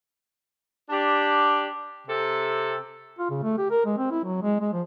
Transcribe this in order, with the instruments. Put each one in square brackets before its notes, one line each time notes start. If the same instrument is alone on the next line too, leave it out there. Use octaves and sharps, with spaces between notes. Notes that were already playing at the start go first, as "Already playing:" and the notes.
[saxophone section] D4 G4
C3 A4
[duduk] F4
C#3
A3
G4
A#4
G#3
C4
E4
F#3
G#3
G#3
F3